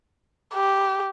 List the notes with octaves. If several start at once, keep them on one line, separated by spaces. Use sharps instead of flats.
G4